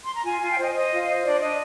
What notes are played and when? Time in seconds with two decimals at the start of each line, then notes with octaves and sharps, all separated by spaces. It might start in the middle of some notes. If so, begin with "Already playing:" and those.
0.04 C6
0.14 A#5
0.25 F4 G#5
0.37 G#5
0.41 F4
0.50 G5
0.58 C5 D#5
0.75 C5 D#5
0.92 F4
1.08 C5
1.25 D4 D5
1.41 D4 D#5